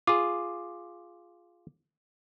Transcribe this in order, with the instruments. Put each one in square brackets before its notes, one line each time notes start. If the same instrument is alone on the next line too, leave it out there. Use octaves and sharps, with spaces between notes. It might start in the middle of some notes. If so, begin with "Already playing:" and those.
[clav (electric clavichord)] F4 G#4 [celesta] D6